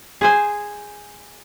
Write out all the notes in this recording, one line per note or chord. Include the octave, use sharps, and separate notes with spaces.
G#4 C5 G#5